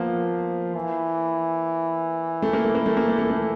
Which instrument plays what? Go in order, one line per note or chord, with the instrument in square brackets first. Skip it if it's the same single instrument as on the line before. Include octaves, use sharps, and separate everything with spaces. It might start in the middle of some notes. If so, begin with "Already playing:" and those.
Already playing: [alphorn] F3 [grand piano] A#3 B3
[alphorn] E3
[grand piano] A3
A#3
A3
A#3
A3
A#3
A3
A#3
A3